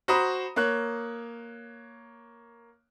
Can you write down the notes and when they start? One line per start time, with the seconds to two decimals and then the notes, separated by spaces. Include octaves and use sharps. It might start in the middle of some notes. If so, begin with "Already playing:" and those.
0.08 F#4 C5 A#5 B5 D#6
0.56 A#3 C#5 F#6